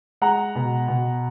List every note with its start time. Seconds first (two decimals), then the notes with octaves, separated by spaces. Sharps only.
0.22 G#3 F#5 A#5
0.55 B2
0.88 B2